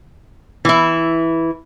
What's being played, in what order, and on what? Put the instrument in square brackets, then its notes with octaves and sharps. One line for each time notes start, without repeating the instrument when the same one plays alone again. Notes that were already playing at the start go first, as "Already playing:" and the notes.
[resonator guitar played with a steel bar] E3 E4